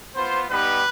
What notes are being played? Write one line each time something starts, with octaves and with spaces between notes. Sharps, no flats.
B3 F4 C5
G3 B3 D#4 G4 B4